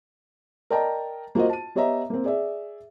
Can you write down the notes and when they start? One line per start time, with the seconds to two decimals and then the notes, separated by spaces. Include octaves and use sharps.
0.70 A#4 D5 D#5 G5 A5 A#5
1.35 A#3 F4 F#4 C5 D#5
1.50 A5 D#7
1.75 B3 G4 C#5 D#5 E5 A#5
2.10 A#3 C4
2.24 G#4 D5 E5